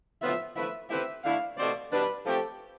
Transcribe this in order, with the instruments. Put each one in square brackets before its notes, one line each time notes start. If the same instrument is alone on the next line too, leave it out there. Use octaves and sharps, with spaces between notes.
[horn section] A2 F3 B3 F4 C5 [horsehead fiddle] E5
[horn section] F3 A3 E4 B4 [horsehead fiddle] E5
[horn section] A3 C4 E4 G4 B4 [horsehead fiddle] E5
[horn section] D3 A3 E4 [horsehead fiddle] F5
[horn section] B2 A3 C4 G4 C5 [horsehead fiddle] D5
[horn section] B2 G3 D4 [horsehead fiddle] B4
[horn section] F3 A3 C4 G4 [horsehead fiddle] A4